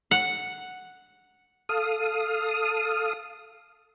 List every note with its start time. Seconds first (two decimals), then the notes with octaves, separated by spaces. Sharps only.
0.11 F#5
1.69 A4 F5 D#6